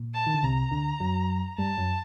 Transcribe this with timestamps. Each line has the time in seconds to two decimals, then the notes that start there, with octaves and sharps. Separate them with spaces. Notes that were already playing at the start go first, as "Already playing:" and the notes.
Already playing: A#2
0.14 A5
0.26 D#3
0.34 D3
0.43 C2 C3 A#5
0.71 D2 D3
1.00 F#2 F#3
1.58 G2 G3 A5
1.78 F#2 F#3